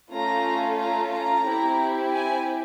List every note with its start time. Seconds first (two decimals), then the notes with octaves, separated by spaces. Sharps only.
0.11 A3 C#4 F4 A4 A#5
0.78 A#5
1.12 A#5
1.46 C4 E4 G4
2.13 G#5